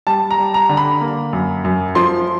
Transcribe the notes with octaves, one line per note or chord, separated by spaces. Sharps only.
G3 A5
A#5
G3
A#5
D3
B5
A#3
F#2
F#2
F3 C6